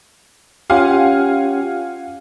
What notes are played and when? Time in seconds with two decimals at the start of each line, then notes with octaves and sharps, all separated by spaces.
0.70 C#4 F4 G4 F5 F#5 G#5